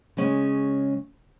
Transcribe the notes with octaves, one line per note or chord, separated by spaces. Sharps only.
C#3 G#3 C#4